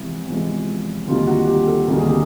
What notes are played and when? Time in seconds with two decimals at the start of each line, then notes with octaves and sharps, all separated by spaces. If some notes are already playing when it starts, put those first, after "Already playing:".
Already playing: E2 C3 F3 G#3 E4
0.28 E2 C3 F3 G#3
1.07 D2 C3 D#3 G3 A#3 F4
1.21 G4
1.27 F#4
1.47 G4
1.67 A4
1.87 D2 C3 D#3 G3 A#3 G4
1.98 G#4
2.08 G4